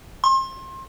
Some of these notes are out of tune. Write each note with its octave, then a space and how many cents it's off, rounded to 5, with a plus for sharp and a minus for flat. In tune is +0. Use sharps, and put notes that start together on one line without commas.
C6 +30